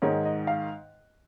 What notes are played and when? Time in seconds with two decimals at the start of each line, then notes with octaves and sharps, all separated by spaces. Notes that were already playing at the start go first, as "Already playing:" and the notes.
0.02 G#2 D#3 G#3 D#4 C#5
0.25 D#5
0.47 F5